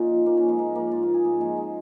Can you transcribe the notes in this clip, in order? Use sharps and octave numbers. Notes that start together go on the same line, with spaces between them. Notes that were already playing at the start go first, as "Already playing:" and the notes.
Already playing: A#2 A#3 C#4 D#4 F4
F3
A#2 A#3
C#4
F3
G#3
G#2 A#3
F3 A#3
G#2 F4
F4
F3
G#4
G#2 A#3
F3 G#3
G#3